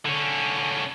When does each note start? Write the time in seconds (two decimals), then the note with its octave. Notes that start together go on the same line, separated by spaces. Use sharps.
0.06 D3 C#4